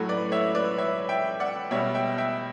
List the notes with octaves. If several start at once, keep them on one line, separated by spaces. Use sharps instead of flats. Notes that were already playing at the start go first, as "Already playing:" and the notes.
Already playing: A2 F#3 A3 F#4
B4 D5
C#5 E5
B4 D5
C#5 E5
E5 G5
D5 F#5
B2 G3 C#5 E5
E5 G5
E5 G5